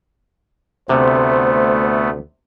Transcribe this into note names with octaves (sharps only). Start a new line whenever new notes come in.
D2 C3 A3 B3 C5